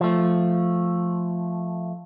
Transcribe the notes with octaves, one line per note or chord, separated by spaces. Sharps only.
F3 A3